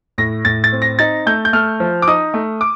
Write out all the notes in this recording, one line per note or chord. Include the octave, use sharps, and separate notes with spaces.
A2 A#6
A2 A6
A6
C4
A#6
D#4 A6
A3 G6
G6
A3 F6
F3
D6
D#4 D#6
A3
D6